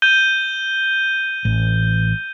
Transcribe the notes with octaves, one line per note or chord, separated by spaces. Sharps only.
G6 D#7 G7
A1